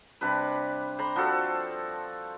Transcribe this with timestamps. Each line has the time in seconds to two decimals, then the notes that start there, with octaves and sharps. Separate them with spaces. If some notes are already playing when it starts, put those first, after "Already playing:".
0.21 C3 G3 D4 B4
0.98 C5 A#5 B5
1.16 F3 F#4 A4